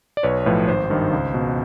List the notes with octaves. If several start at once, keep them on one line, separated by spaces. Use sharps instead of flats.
D5
B1 B4 C#5
A2 F3 B4
G#1 C5
G2 D#3
C#2
B2